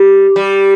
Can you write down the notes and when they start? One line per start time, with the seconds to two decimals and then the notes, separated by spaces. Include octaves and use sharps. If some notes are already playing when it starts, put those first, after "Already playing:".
Already playing: G3
0.36 G3